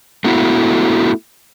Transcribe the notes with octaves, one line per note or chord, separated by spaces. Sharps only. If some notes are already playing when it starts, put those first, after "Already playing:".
A3 B3 E4 F#4